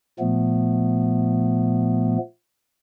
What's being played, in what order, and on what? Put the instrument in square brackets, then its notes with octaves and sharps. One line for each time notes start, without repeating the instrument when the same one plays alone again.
[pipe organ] A#2 F3 A3 B3